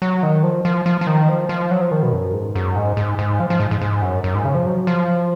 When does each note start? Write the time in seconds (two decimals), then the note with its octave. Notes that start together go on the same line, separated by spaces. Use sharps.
0.02 F#3
0.23 D#3
0.43 F3
0.65 F3
0.86 F3
1.01 F3
1.07 D#3
1.29 F3
1.49 F3
1.71 F#3
1.81 F3
1.91 D#3
2.03 B2
2.13 F#2
2.33 G#2
2.55 F#2
2.76 G#2
2.97 G#2
3.19 G#2
3.40 F3
3.50 F3
3.60 G#2
3.71 G#2
3.81 G#2
4.02 F#2
4.24 F#2
4.35 G#2
4.45 C#3
4.55 F3
4.66 F#3
4.87 F3